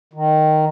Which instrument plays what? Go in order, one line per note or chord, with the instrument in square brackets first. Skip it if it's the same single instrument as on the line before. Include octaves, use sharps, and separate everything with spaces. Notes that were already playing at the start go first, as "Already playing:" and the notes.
[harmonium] D#3